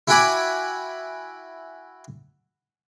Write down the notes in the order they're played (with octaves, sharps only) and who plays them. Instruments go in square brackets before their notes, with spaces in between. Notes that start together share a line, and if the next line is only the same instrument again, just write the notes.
[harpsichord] E4 F#4 G5 G#5 B5 D6